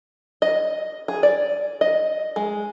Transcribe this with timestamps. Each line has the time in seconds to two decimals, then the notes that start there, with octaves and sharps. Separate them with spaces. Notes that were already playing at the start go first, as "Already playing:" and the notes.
0.42 D#5
1.08 G#4
1.23 D5
1.81 D#5
2.36 G#3